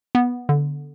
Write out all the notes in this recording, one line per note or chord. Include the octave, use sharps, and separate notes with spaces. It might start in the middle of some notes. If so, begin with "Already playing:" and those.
B3
D3